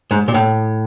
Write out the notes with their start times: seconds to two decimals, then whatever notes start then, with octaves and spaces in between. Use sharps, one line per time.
0.11 G#2
0.28 A#2
0.34 A2